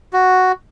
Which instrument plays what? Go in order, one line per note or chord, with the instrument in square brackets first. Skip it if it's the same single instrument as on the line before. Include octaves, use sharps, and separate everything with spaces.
[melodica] F#4